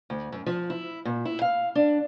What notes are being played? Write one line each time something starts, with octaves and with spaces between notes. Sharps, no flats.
D2
F#2
F3
E4
A#2
E4
F5
D4